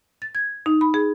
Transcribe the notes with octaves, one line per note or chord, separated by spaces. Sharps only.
A6
G#6
D#4
B5
G#4